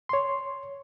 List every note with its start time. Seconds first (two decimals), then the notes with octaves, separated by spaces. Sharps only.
0.09 C#5 C6